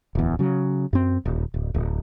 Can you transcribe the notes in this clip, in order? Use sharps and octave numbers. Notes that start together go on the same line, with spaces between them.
D1 E2
C#3 F#3
F#2 C4
D#1
D1
D1